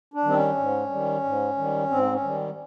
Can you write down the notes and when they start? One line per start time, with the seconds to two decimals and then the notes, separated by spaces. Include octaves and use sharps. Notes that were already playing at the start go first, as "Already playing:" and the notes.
0.14 D4
0.24 D#3 G3 C4
0.36 C#4
0.57 G#2
0.90 D#3 G3
1.24 G#2
1.57 D#3 G3
1.90 G#2 C4
2.13 C#4
2.23 D#3 G3